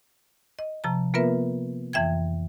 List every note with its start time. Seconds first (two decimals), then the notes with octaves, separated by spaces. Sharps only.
0.59 D#5
0.84 C3 F3 A5 A#5
1.14 A#3 B3 F4 A#4 B4 E5
1.93 F2 E3 E5 G5 G#6